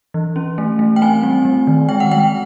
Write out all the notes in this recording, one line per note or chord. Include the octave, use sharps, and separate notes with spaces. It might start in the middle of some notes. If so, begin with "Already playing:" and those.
E3
C#4
A3
A3
G5
C4 G#5
G3
G3
D#3
G#3 G5
F#5
G#3 G5